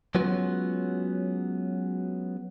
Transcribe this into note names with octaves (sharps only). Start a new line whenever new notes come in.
F#3 G#3 B3 C#4 F4 F#4